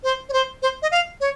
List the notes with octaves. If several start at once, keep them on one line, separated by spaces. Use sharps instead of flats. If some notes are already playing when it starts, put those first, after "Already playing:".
C5
C#5
C5
C5
D#5
F5
C#5